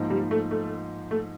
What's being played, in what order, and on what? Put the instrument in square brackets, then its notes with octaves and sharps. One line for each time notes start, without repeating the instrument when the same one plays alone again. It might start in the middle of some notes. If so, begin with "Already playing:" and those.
Already playing: [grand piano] G#2 F3 A#3 D#4
[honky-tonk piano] G3
A3
A3
A3